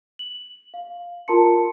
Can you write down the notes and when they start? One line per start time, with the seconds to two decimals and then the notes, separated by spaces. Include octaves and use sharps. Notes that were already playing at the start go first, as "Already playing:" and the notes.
0.19 F#7
0.74 F5
1.28 F4 A#4 A5 A#5 C6 C#7